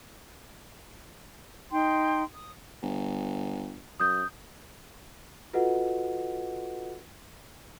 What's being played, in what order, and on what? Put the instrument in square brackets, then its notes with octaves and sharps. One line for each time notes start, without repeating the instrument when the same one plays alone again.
[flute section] D#4 G5 C6
D#6
[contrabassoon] G1
[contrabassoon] F#2 [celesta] D#6 G6
[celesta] F4 F#4 A4 B4 D#5 F#5